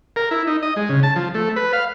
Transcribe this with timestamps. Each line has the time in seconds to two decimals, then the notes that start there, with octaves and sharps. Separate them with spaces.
0.16 A#4
0.31 E4
0.47 D#4
0.63 D#5
0.76 G#3
0.89 C#3
1.03 A5
1.16 F3
1.34 A3
1.56 B4
1.73 F5